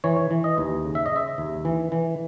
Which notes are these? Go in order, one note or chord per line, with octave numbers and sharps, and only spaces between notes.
E3 C#5
E3
D#5
D#2
C#3
E5
D#5
C#3 E5
D#2
E3
E3